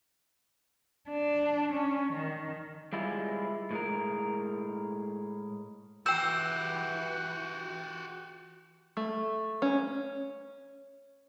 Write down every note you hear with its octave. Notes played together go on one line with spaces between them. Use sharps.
D4
C#4
D#3
G3 G#3 E4 F4
A2 G#3 A#4
E3 F#4 G4 G5 E6 G6
A3
C#4